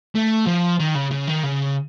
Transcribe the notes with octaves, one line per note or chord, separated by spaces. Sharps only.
A3
F3
D#3
C#3
C#3
D#3
C#3